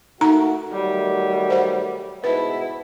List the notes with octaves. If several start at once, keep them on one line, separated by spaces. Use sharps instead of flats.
A3 A#3 D#4 F#4 A#5
D#3 F#3 G3 A3
C5 F#5
G#2 B2 E4 B4